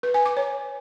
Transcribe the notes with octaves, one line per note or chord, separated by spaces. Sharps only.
B4
G#5
D6
C#5